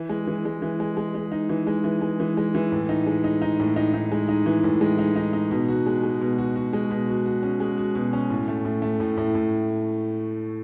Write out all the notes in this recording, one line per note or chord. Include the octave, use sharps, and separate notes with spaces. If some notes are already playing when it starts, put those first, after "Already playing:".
Already playing: E3
G#3
E3
G#3
E3
G#3
G#3
G#3
D#4
E3
G#3
E3
G#3
E3
G#3
E3
A2
D#4
G#3
D#4
D#4
A2
D#4
D#4
G#3
D#4
E3
A2
G#3
D#4
D#4
D#4
B2
F#4
G#3
G#3
B2
F#4
F#4
G#3
B2
F#4
F#4
C#4
G#3
F#4
B2
C#4
A2
A3
A2
A3
A2
A2
A2